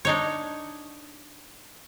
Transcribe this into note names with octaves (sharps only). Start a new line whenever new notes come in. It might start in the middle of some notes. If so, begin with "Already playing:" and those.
D4 D#4 C#5